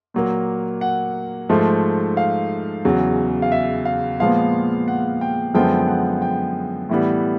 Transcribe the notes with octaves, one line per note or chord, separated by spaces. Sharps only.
A#2 F#3 A#3
F#5
G#2 F3 A3
F5
E2 C#3 F#3
F5
E5
F5
A#2 F3 G#3 B3 F5
F#5
G5
F#2 D3 F3 G#3 B3 G5
G5
F#5
G5
A2 E3 G3 B3